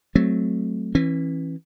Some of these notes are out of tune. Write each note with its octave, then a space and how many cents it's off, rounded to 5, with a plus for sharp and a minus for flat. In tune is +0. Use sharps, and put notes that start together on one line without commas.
F#3 +0 A3 -10 C4 +0
E3 -5 C#4 -40